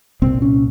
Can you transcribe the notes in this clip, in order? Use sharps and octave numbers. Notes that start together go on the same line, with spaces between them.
C2 A#2 C4
C#4